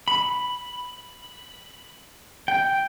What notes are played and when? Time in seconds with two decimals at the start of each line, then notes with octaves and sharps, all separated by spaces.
0.08 B5
2.48 G5